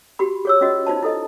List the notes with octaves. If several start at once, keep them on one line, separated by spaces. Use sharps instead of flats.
F#4 G4 B5
G#4 C#5 E6
C#4 F4 F#4 D#5
D#4 F4 C5 A5
E4 A4 D#5